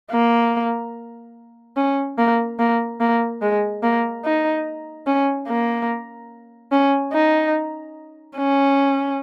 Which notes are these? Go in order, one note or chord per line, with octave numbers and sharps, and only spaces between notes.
A#3
C#4
A#3
A#3
A#3
G#3
A#3
D#4
C#4
A#3
C#4
D#4
C#4